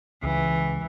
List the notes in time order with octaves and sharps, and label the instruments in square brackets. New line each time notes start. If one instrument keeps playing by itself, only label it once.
[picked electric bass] C#2 [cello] E3